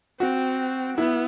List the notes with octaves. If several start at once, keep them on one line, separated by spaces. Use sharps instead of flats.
C4 F#4
B3 E4